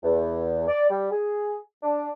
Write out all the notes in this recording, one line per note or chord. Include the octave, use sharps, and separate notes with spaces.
E2
D5
G3
G#4
D4